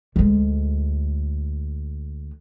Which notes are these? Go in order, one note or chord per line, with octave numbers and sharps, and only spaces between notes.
D2 G#3